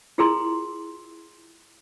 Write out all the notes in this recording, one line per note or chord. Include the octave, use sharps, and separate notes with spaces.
E4 F4 G#4 A#4 A#5 C6